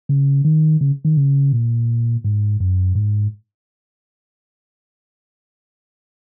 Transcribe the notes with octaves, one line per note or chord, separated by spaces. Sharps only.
C#3
D#3
C#3
D#3
C#3
A#2
G#2
F#2
G#2